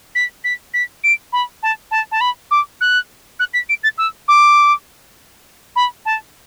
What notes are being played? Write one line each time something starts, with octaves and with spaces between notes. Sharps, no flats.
B6
B6
B6
D7
B5
A5
A5
A5
B5
D6
F#6
F#6
B6
D7
A6
E6
D6
B5
A5